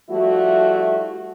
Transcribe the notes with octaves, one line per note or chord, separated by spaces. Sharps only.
F3 G3 A3 E4 F#4